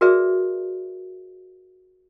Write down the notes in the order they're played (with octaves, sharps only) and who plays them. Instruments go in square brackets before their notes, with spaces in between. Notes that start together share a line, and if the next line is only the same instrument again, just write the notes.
[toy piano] F#4 G#4 A#4 B4 D5 E5